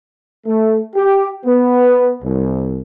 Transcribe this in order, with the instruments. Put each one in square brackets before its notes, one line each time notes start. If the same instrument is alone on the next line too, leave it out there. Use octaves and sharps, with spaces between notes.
[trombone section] A3
G4
B3
C2